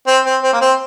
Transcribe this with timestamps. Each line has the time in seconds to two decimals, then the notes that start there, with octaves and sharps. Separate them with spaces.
0.07 C4
0.25 C4
0.42 C4
0.53 A#3
0.61 C4